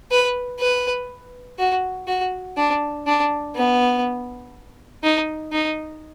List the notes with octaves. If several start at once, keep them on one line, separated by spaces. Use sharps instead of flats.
B4
B4
F#4
F#4
D4
D4
B3
D#4
D#4